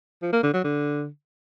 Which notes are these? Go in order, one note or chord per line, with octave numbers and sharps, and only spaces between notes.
F3
A#3
D3
F#3
D3